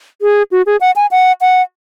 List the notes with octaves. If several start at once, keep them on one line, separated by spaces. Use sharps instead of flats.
G#4
F#4
G#4
F#5
G#5
F#5
F#5